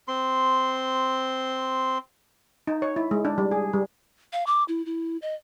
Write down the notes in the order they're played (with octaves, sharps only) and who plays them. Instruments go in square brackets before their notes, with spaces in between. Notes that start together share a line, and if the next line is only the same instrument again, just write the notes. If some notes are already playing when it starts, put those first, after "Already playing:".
[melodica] C4 C6
[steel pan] D#4
C#5
E4
G#3
D4
G3
G#4
G3
[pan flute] F5
D6
E4
E4
D#5